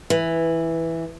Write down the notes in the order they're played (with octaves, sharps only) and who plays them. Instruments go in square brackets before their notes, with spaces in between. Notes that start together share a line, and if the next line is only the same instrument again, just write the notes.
[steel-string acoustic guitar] E3